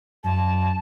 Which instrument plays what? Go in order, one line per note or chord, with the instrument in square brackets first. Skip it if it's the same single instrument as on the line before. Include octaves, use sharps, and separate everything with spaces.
[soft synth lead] F#2 [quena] A5